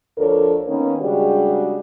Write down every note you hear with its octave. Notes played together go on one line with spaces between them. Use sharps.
D2 F3 D4 A4 A#4 C#5
D#3 A#3 B3 C#4
C#3 G3 G#3 D4 F#4 G4